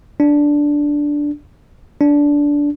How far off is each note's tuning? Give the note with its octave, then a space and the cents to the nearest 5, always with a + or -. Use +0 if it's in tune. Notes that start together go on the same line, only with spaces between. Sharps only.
D4 -5
D4 -15